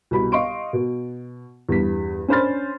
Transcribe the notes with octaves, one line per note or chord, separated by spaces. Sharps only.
C2 B2 B5
D#5 F5 C6 C#6 D7
B2
E2 G2 B6
C#4 D4 C5 B5 F6 A6